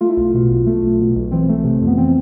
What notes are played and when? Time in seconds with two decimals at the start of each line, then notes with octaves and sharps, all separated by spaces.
0.01 A3 F4
0.09 E4
0.17 B1 F4
0.34 B2
0.50 B1
0.66 A3
0.83 B1
1.00 B2
1.16 B1
1.31 E3 C4
1.49 A3
1.64 C3
1.81 F2
1.87 B3
1.98 E3 C4